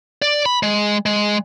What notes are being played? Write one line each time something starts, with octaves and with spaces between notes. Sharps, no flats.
D5
B5
G#3
G#3